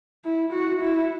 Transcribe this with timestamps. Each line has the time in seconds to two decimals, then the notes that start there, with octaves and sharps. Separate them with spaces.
0.25 E4
0.53 F#4
0.81 E4